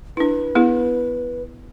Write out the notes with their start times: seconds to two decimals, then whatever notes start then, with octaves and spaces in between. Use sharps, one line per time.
0.17 D4 E4 B4
0.55 B3 E4 G#4